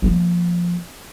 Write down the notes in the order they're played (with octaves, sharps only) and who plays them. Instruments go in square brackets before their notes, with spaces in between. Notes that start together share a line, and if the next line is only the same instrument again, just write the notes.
[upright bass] F3 A#3